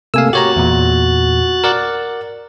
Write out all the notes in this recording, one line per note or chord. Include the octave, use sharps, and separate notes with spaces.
C3 A3 A#3 F5 G#5 E6
F#4 G4 C#5 A#5 F#6 A6
E2 A#2
A#4 D5 F#5